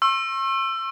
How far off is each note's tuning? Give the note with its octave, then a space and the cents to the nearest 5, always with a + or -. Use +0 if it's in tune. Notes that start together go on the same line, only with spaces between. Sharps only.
C#6 -45 E6 +20